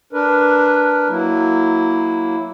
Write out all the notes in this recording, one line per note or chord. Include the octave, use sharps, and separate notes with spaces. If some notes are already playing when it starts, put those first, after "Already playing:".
D4 A#4 B4
F#3 A#3 E4